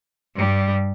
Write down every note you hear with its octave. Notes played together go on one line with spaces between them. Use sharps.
G2 G3